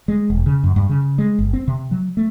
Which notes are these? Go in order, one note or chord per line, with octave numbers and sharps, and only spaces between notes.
G#3
E1
C#3
F#2
G2
C#3
G#3
G1
C4
C3
F#3
A3